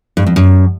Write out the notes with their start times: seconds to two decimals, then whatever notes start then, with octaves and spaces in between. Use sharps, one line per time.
0.17 G2
0.26 F2
0.36 F#2